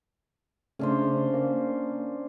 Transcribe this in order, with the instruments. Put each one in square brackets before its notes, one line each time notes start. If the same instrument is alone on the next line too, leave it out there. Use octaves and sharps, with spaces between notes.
[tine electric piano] C#3 A3 [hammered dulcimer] C#4 D4 C5
[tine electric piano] A#3